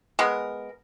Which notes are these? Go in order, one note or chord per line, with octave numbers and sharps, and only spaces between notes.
G#3 B3 A#4